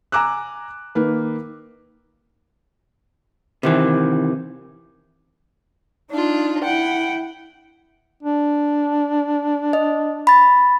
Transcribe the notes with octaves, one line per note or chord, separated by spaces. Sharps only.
G#5 A#5 D6 E6 F#6
D#3 A#3 B4
C3 D#3 E3
D4 D#4 F4
E4 F#5 G5
D4
D#5
B5 A6